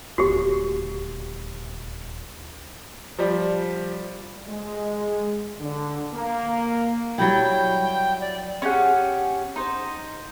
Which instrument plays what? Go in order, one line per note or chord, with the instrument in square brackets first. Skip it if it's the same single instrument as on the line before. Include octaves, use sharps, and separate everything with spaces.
[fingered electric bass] D#1 D2 [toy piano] F#4 G4
[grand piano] F3 G3
[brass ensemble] G#3
D3
A#3
[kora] F#3 G3 E4 [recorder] G5
[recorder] D5
[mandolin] C#4 G4 G#4 F#5
D#4 C5